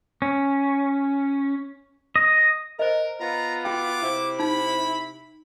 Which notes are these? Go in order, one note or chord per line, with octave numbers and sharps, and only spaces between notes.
C#4
D#5
A#4 C5 D#5
B3 F4 A#5
F#4 G5 D6
C3 E4
D#4 B5